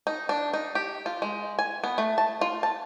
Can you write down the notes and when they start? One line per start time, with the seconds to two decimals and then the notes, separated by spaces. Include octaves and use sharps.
0.07 D#4
0.29 D4
0.54 D#4
0.75 G4
1.06 F4
1.22 G#3
1.59 G#5
1.84 B3
1.98 A3
2.18 A5
2.41 F4
2.63 A5